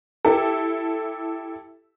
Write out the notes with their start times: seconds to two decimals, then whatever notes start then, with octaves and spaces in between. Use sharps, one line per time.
0.25 E4 G4 A4